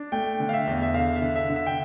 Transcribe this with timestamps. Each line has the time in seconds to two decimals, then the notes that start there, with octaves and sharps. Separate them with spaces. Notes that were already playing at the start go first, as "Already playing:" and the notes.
Already playing: D4
0.12 A3 G5
0.40 D3
0.49 F5
0.53 E5
0.67 E2
0.82 E5
0.94 D3 F5
1.16 E5
1.22 D3
1.36 E5
1.50 D3
1.56 E5
1.66 G5